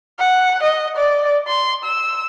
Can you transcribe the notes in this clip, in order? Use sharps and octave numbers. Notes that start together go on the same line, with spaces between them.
F#5
D#5
D5
C6
E6